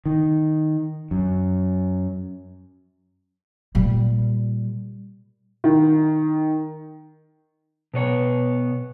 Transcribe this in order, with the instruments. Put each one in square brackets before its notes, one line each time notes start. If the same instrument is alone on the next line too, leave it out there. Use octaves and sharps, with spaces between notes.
[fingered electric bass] D#3
F#2
[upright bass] A#2 G3
[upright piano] D#3
[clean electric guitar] B2 B3 C#5